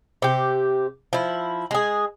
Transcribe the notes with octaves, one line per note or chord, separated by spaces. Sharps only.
C3 G4
F3 E4
G#3 G#4